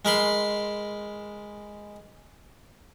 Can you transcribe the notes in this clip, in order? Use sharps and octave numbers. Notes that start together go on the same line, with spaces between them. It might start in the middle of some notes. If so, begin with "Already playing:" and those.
G#3 A#4 B5 C6